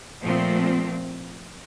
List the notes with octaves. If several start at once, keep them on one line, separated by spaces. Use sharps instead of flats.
A#2 F3 A3 C4